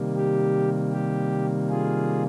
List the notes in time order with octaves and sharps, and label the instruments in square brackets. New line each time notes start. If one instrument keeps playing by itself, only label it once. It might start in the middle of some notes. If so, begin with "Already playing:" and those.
Already playing: [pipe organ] C3 D#3 G3 A#3
G4
G4
F4 G#4